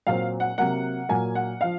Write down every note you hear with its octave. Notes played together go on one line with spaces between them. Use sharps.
A#2 F#3 C4 F5
F#5
C3 F#3 A#3 F#5
A#2 F#3 A#3 G#5
F#5
F3 F5